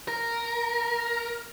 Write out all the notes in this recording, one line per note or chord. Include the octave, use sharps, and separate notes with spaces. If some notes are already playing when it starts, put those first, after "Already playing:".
A#4